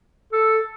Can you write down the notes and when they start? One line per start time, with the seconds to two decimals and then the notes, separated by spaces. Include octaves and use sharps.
0.33 A4